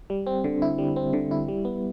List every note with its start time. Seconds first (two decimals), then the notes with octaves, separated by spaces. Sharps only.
0.10 G3
0.27 C4
0.44 D3
0.62 E4
0.78 G3
0.96 C4
1.13 D3
1.31 E4
1.48 G3
1.65 B3